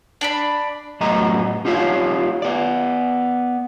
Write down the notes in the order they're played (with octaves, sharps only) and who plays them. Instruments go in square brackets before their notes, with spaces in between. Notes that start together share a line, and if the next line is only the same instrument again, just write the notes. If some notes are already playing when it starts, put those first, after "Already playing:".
[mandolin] D4 D5 B5
[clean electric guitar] F#2 A2 G3 B3 D#5 A#5
D#4 F4 G4 C5 C#5 F5
B3 D5